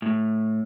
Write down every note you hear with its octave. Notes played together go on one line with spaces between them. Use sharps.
A2